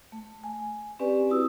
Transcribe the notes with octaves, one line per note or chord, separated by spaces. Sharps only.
A3
G#5
C4 C#4 G4 B4 D5 G#5
C4 E4 F#4 D#6 E6